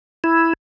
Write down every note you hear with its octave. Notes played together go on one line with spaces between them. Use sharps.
E4